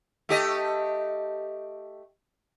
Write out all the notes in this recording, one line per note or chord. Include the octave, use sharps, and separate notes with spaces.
A3 G4 D#5